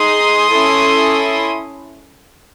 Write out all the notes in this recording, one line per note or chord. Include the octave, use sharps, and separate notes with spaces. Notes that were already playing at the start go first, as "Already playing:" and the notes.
Already playing: D#4 G#4 C6 D#6
C#4 E4 A4